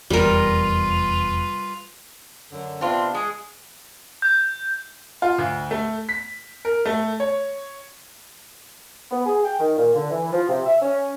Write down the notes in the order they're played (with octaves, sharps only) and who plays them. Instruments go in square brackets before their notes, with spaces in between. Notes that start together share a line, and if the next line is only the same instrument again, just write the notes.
[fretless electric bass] F1 E2 [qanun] G3 A#4 [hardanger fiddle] F4 B4
[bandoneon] F#2 D3
[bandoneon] C3 B3 D4 [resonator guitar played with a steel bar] C4 F4
[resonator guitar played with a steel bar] G#3 [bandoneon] G#4
[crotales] G6
[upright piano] F4
D2
A3
B6
A#4
A3
C#5
[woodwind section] B3
G#4
G5
D#3
A#2
D3
E3
F3
C3
E5
C#4